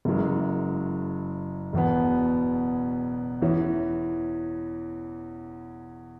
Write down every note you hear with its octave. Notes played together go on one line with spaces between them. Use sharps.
F#1 F#2 E3 G#3
E1 E2 B2 B3
E2 E3 C#4